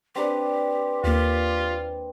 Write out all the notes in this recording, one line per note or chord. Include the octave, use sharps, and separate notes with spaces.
C4 D4 G4 B4
D#2 A#3 F4 G4